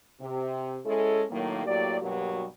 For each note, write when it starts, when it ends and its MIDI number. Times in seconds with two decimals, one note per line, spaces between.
0.20 0.79 48
0.86 1.23 56
0.86 1.23 61
0.86 1.23 64
0.86 1.23 69
1.30 1.62 45
1.30 1.62 51
1.30 1.62 54
1.30 1.62 58
1.65 1.96 45
1.65 1.96 54
1.65 1.96 58
1.65 1.96 67
1.65 1.96 74
2.01 2.45 43
2.01 2.45 47
2.01 2.45 54
2.01 2.45 58
2.01 2.45 66
2.01 2.45 67